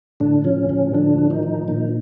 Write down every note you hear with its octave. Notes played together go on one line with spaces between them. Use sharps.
A2 D3 D4
C#3 F3 C#4
A2 C#3 C#4
D3 F3 D4
A2
D#3 D#4
F3
A#2 D#3 D#4